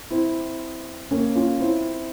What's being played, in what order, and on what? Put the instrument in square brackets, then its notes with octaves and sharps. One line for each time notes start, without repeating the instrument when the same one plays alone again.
[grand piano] C4 E4
A#3 C#4
C#4 F4
C4 E4